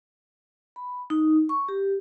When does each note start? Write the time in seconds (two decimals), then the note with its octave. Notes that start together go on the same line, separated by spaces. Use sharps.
0.76 B5
1.10 D#4
1.49 C#6
1.69 G4